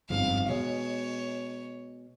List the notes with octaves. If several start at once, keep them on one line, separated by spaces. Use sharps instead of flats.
G1 F2 G#2 F5
B2 G#3 C#5